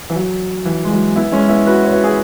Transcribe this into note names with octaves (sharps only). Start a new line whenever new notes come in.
E3
F#3
E3
G#3
F#3
B3 E4
G#3 C#4
B3 E4
F#4 B4
C#5
F#4 B4
E4 G#4